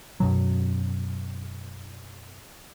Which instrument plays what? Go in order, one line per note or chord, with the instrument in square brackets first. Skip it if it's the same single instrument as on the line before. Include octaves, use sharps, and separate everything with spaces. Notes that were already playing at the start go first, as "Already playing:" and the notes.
[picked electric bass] F#2 B2 F#3